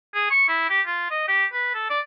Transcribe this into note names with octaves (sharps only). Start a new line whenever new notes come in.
G#4
C#6
E4
G4
F4
D#5
G4
B4
A4
D5